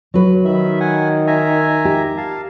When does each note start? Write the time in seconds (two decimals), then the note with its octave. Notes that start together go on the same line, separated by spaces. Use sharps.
0.14 F#3 B4
0.45 D#3 E5 B5
0.80 F#5 G#5
1.27 E5 G#5 A#5
1.85 G4
2.17 F5 A5